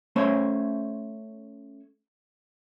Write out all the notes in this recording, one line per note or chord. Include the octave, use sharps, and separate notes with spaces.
A3 C#4 C5 C#5